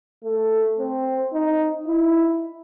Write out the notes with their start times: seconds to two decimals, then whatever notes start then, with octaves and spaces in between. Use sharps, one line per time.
0.24 A3
0.79 C4
1.33 D#4
1.88 E4